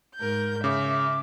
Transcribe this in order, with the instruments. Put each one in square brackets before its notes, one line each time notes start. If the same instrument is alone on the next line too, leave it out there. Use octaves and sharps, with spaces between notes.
[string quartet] G#2 A#4 G6
[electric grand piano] C#3 [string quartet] E5 [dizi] D6